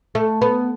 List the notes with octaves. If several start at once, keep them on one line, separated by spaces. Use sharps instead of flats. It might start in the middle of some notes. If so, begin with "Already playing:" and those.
A3
B3